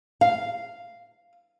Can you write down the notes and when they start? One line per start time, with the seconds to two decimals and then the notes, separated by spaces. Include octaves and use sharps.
0.21 F5